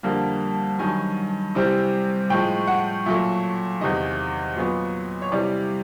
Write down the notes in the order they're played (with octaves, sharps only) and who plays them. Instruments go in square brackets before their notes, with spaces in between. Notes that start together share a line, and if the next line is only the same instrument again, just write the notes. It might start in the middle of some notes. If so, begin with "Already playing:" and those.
[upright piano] F2 D3 G3 A#3
G2 D#3 F#3 G#5
C3 E3 G3 C4
A2 F3 G#3 G5
F#5
A#2 F#3 A3 E5
E2 C3 D#3 D#5
A#2 F#3 B3
C#5
C3 E3 G3 D5